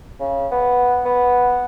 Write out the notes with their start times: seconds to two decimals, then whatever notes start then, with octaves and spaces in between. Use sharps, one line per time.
0.20 C#3
0.51 B3
1.05 B3